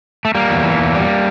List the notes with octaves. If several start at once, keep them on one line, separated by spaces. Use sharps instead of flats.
A3
G3 A#3
E2
E3
E2
G3